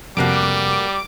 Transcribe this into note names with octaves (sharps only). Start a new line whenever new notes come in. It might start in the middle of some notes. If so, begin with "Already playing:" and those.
F2 C3 G3 A3 A#3 F#4 D6